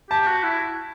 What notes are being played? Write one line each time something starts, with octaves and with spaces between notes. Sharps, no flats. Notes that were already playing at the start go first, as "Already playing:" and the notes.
G4 A5
F#4
E4